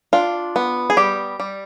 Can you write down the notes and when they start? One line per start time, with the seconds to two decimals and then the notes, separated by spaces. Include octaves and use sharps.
0.13 D4 F4
0.56 B3
0.90 G#4
0.97 G3 G4
1.40 G3